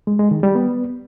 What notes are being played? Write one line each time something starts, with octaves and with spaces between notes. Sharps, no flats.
G#3
G#3
D#3
G3
B3